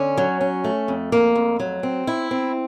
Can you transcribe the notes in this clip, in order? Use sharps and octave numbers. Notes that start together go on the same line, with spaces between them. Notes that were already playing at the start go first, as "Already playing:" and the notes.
Already playing: D3 C#4
F#3
C#4
A3
F2
A#3
F2
F#3
C4
E4
C4